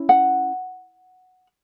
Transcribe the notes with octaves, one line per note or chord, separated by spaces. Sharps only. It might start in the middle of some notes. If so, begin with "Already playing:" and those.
Already playing: C#4 E4
F#5